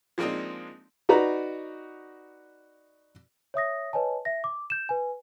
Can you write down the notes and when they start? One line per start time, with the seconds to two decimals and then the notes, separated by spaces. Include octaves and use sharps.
0.18 F3 G#3 A#3 C4 D4 D#4
1.09 D#4 F#4 B4 D5 A#5
3.54 C#5 E5 D#6 A#6
3.93 B4 C#5 D#5 G#5 A5
4.25 E5 A#6
4.44 D6
4.70 G6 E7
4.89 B4 G#5